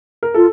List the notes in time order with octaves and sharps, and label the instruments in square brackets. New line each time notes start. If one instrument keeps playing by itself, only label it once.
[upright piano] A#4
[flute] F4 [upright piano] A4